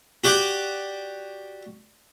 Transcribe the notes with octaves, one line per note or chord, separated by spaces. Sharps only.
F#4 G4 D5